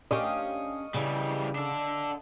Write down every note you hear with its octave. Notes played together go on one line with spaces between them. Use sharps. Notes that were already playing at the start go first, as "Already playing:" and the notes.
C#4 D4 G4 D#5 F5 C#6
C#3 E3 G3
D4 A4